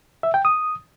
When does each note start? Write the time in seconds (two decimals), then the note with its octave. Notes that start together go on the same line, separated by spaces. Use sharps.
0.23 E5
0.34 G5
0.45 D#6